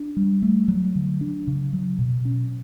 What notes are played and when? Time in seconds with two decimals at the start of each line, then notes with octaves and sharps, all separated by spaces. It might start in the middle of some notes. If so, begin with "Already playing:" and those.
Already playing: D4
0.17 G3
0.42 A3
0.68 F#3
0.95 D3
1.21 D4
1.47 C#3
1.73 F#3
1.99 B2
2.25 C#4